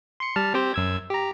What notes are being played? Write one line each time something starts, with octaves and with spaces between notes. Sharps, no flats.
C6 C#7
G3 A5 F6
C4 G4 C5
F#2 E6 G#6
G4 A#5